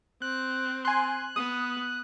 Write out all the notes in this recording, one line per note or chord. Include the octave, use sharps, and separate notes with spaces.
C4 F#6
G#5 C6 F#6
B3 D#6